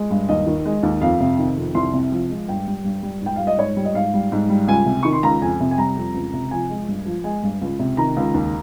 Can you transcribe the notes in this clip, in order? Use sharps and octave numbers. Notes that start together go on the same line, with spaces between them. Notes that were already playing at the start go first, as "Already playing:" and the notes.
Already playing: G#3
G2
D#2 D#5
D#3
G#3
D#2
F2 F5
C3
D#3
F2
C2 C6
C3
F3
G#3
G2 G5
G3
G2
G3
G#2 G5
G3 F5
D#5
G#2 C#5
G3
D#5
G#2 F5
G3
G#2
G3
C#2 G#5
C3
D#3 C#6
C6
C#2 A#5
F2 G#5
C3
G#5
G3 A#5
F2
C#2
C3
F3 G#5
G#3
G2
F3
G#3 G#5
G2
C#2
C3
D#3 A#5
C#2
D#2